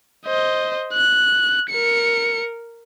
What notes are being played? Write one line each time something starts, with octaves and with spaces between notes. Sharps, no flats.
C5 D#5
F#6
A#4 C#7